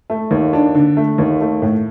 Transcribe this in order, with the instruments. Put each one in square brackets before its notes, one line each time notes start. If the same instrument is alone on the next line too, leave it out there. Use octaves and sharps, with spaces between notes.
[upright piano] A3
D#2
D4
D3
A3
D#2
A3
A2